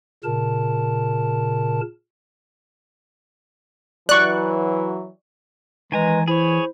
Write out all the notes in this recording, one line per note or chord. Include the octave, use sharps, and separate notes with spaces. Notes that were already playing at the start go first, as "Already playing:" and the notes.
A#2 C#3 A#4 A5
E3 F#3 D5 C#6 F#6
D#3 E3 G#3 B4 G#5 A#5
E4 G#4 C5 C#5